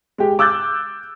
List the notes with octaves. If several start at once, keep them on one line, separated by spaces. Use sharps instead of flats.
G#3 G4
D6 E6 F#6 G6 A6